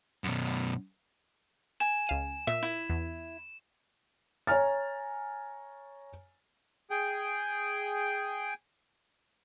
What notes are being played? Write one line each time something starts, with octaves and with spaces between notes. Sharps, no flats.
F#2 B2
G#5 E7
C#2 F5 D#7
A#2 E5
E4
E2
C#5 G#5 A#5 F6 A6
G#4 G5